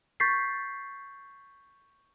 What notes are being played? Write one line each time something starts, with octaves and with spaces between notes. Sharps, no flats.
C#6 G6 A6 B6 C7